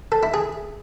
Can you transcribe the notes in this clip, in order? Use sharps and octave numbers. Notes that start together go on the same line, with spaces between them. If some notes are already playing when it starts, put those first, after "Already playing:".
A4
E4
G#4